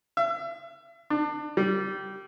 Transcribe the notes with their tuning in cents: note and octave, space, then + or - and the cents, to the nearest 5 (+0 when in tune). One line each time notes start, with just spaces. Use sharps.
E5 +35
D4 +25
G3 -20